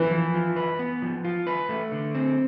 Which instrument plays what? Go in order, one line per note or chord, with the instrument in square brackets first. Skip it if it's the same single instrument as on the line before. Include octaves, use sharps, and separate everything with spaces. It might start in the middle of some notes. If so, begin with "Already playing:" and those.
Already playing: [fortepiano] E3
[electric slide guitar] F3
F4
B4
B3
F3
F4
B4
A3
D3
C4